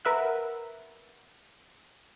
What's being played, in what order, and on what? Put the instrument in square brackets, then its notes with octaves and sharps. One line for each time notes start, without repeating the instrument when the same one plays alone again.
[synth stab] A#4 B4 E5 F#5